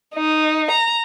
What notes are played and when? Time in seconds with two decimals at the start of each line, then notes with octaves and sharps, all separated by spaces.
0.15 D#4
0.71 A#5